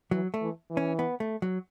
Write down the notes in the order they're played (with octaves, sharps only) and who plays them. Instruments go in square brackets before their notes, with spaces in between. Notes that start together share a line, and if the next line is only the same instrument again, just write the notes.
[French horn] E3 [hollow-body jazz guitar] F#3
[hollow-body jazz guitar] A3
[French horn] E3
E3
[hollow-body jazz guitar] C#4
B3
A3
F#3